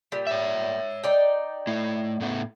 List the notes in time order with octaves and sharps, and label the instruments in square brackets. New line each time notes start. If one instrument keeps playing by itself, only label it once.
[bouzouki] A#2 G3
[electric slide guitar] C#5 E5
[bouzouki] D#4 D5 G5
[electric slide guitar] A3 E4
A2 A3 B3